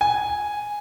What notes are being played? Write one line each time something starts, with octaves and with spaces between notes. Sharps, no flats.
G#5